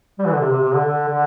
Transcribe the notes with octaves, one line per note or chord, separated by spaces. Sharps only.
G3
E3
D3
C3
C3
C3
D3
D3
D3